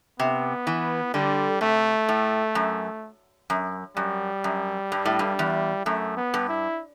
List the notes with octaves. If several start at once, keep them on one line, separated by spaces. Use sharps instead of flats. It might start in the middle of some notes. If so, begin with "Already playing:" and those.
C3 B3
E3
D3 G3
C3 A3
A2
F#2
F#2
F#2 G3
F#2
G2
A2
G2
E2
F#2 A3
B3
G2
E4